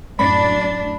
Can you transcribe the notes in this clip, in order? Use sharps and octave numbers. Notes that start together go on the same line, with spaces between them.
F#2 A2 D4 B5